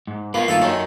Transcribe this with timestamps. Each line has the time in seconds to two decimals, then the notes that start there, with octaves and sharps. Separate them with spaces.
0.07 G#2
0.34 A#3 B3 F4 B4
0.48 G2 D#3 A#3 F4 A4 E5
0.62 F#2 C#4 A#4 D#5